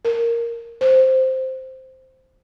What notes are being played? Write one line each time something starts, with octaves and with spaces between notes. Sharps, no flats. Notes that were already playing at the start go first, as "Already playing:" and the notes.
A#4
C5